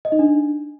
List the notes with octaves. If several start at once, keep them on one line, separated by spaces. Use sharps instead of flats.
D#5
D#4
D4